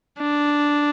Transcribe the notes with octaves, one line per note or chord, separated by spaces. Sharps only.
D4